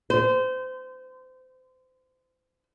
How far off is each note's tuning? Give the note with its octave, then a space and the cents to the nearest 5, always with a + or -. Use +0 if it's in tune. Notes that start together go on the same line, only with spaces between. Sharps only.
C5 -30